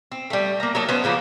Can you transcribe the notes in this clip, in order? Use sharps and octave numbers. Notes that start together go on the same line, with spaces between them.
C4
G3 A3
A#3 A#5
F#3 A#3 D#4 A4
B3 C#4 C5
C#3 F3 A#3 B3